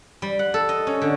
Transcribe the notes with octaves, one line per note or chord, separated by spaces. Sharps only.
G3
F#5
A4
D#5
C#4
D3